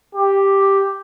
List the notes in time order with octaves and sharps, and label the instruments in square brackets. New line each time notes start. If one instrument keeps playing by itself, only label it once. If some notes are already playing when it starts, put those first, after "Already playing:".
[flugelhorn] G4